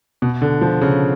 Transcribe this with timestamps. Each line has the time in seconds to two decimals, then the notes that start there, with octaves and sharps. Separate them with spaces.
0.22 B2
0.42 D3
0.61 F3
0.81 C#3